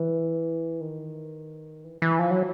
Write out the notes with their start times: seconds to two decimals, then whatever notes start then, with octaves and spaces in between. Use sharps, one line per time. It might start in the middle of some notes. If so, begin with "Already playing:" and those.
Already playing: E3
0.81 D#3
1.84 E3
2.02 E3
2.19 F3
2.31 F#3